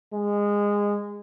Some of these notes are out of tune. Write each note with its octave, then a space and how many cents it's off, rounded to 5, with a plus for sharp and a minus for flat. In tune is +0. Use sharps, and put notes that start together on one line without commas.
G#3 -20